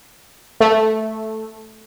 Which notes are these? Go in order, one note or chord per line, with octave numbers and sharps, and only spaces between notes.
A3